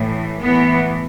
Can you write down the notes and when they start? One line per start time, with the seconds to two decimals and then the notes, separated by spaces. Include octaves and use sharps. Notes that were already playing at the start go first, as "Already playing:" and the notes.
Already playing: A2 E3
0.40 A2 E3 B3